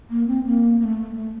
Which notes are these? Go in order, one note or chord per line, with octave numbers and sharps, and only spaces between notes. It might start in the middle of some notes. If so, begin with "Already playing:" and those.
A#3
C4
A#3
A#3
A3
A3